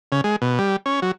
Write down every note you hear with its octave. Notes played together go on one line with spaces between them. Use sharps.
C#3
G#3
B2
G3
C#4
F#3